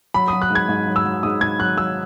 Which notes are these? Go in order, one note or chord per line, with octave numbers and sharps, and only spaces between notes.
F#3 B5
F#3 D#6
F#6
G#2
G#6
G#2
F#3
E6
F#3
G#2 D#6
G#2 G#6
F#3 F#6
F#3 E6